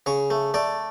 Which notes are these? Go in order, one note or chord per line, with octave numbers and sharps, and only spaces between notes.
C#3 C#5
A3
A3 D5